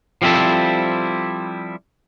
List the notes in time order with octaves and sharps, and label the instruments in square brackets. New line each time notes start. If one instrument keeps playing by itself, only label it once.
[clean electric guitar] F3 G3 C4 E4 A4